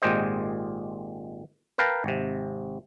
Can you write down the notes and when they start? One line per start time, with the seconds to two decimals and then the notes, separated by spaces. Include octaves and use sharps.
0.02 G#1 A#2 G#3 G4 C5 D#5
1.78 A#4 B4 F5 G5 A5 A#5
2.04 G#1 C3